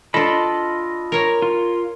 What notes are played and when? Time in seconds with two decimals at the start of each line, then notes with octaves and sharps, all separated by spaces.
0.14 D4 F4 A4 D#5 B5
1.12 A#4 C#5
1.42 F4